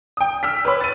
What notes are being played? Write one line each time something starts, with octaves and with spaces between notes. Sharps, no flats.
G5 D#6
E6 F6 B6
B4 C#5 B5
A6 D#7